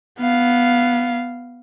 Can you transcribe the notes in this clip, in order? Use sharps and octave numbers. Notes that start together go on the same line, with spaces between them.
B3 F5